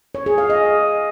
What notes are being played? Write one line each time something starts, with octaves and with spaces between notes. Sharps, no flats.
C#5
G#4
F5
D#5